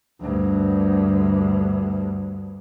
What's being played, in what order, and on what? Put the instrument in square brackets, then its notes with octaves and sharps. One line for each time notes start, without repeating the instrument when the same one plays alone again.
[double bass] D2 G2